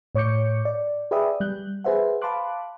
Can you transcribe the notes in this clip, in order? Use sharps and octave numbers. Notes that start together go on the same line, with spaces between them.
A2 C#5 C#6 D6 G6 C#7
D5
G#4 B4 D5 E5 G5 D#6
G3 F#6 G6
G#4 B4 C5 E5 F#5
F5 A5 B5 C6 D6 F#6